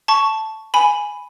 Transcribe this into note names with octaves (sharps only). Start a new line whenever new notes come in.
A5 C#6
G#5 B5